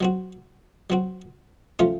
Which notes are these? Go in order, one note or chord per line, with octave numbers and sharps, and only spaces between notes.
F#3 C4 F#4
F#3 C4 F#4
F3 A3 C#4 F4